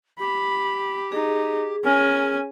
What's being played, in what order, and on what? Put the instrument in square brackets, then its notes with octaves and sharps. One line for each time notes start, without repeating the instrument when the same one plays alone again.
[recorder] G4 [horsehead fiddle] B5
[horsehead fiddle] D#4 [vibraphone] G#4
[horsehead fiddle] C#4 G#5 [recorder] A#4